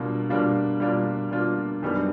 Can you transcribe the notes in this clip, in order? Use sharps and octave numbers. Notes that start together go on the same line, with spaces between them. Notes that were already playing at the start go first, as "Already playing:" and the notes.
Already playing: B2 G3 A#3 D4 F4
B2 G3 A#3 D4 F4
B2 G3 A#3 D4 F4
B2 G3 A#3 D4 F4
F#2 D#3 G3 B3 D4